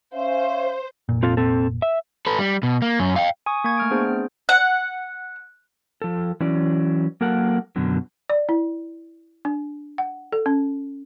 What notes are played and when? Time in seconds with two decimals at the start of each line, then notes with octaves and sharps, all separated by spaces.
0.14 C#4 C5 E5 F5
1.09 F1 A#2
1.23 C4 F4 A4
1.37 C4 A4
1.82 E5
2.27 A4 B4
2.39 G3
2.63 B2
2.82 A#3
3.00 F#2 C#4
3.16 F5 G5
3.46 G#5 C#6 D#6
3.64 A#3 G#5 C#6 G#6
3.77 A3 F6 D7
3.91 B3 D4 G#4 C5
4.09 C4
4.49 F#5
6.02 F3 A4
6.40 E3 F#3 C#4 D5
7.21 F#3 A#3 A4 A#4 F#5
7.76 F#2 B2 D3 F#3
8.29 D5
8.49 E4
9.45 D4
9.98 F#5
10.32 A4
10.46 C#4